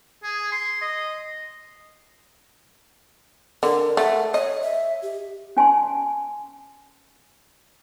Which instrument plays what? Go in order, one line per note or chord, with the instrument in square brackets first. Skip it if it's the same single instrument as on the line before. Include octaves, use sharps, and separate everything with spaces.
[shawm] G#4
C6
D#5
[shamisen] D3 [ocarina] A#4
[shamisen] A3 [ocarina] F#5
[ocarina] C#5 [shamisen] D#5
[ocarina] E5
G4
[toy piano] C#4 G#5 A5 C6